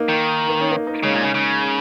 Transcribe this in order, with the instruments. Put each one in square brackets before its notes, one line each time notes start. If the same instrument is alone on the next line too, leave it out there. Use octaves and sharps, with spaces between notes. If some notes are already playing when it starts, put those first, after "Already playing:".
Already playing: [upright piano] A#3 D#4
[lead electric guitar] D#3
[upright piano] A#3
C#4
A#3 D#4
A#3 D#4
[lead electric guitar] C#3 [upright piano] G#3 C#4
[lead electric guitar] A#2
C#3
C#3